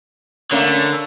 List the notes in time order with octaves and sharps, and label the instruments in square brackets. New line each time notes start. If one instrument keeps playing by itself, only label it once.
[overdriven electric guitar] D3 [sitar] A3 A#3 C#4